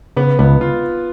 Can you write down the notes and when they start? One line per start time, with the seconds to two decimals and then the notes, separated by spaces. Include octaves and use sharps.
0.16 C#3 B3
0.39 C#2 B3
0.61 F4